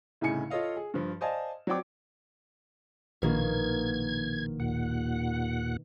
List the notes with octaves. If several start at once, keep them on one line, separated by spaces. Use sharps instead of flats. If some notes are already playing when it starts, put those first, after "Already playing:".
C2 A2 C#3 D#4 G#5 C#7
F4 A4 C#5 D#5 F5
G#4
G2 F3
C5 D5 D#5 F5 G#5 A5
F#3 C4 D5 G5 D6
A#1 B2 D#3 A#3 G#6
D#2 A#2 F#5